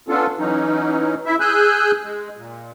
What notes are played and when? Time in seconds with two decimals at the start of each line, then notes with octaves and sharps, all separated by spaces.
0.09 B3 C#4 D4 F4 A4
0.39 E3 F#3 C#4 D#4
1.26 E4 E5
1.40 G#4 G#5 E6 F#6 G6
2.04 G#3
2.37 A#2